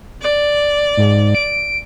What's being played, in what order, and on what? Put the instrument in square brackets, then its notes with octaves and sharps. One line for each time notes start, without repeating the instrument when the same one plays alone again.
[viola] D5
[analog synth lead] G#2
D7